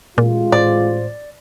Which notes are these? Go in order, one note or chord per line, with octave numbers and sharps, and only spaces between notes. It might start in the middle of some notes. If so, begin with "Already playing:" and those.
A1 A#2 G#3 F4
A2 C5 D5